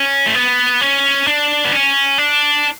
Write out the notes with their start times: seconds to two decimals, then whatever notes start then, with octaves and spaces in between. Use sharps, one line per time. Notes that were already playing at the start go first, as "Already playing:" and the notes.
Already playing: C#4
0.27 A3
0.35 B3
0.81 C#4
1.27 D4
1.65 B3
1.72 C#4
2.18 D4